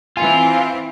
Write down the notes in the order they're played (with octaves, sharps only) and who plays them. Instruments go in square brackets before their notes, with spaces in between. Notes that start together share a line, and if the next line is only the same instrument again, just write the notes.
[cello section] E3 C4 [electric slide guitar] F4 [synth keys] G#5